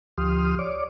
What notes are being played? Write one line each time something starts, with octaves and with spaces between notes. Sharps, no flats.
D2 F3 G4 C6 D#6 F6
C#5 D5 D6